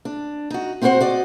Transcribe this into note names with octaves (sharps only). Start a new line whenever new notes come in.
D4
D#4 F#4
C4 E4 F#4 A#4 C5 F#5
F#4 D5 D#5